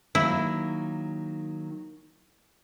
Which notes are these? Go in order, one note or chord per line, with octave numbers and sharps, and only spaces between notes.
D#3 F#3 A#3 E4